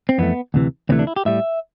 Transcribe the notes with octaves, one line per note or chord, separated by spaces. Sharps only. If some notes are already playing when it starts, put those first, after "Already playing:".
C4
F2 E3 A3 B3
D2 C3 E3
D2 C3 E3 A3 C4
D4
E4
G4
A2 G3 E5